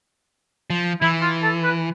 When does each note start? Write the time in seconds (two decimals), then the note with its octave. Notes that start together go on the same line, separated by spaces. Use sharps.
0.70 F3
1.01 E3 E4
1.22 F4
1.43 A4
1.64 B4